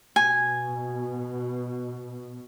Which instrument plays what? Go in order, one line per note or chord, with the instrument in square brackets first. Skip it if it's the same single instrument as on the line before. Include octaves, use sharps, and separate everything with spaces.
[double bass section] B2 [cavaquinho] G#5